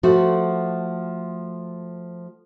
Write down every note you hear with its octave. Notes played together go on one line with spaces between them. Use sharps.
F3 A3 F#4